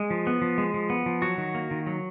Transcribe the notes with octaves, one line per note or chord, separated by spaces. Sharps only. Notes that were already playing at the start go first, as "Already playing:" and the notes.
Already playing: G#3
F3
B3
F3
G#3
F3
B3
F3
F#3 F#4
D#3
A#3
D#3
F#3